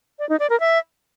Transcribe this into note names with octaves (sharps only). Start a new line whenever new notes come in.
D5
D#4
D5
A#4
E5